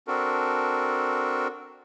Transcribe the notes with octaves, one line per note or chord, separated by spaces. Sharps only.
C4 D4 F#4 A4 A#4